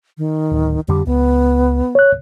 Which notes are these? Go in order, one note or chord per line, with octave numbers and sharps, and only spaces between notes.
D#3
D1
F2 D3 G3 G4
C#2 B3
C#5 F#6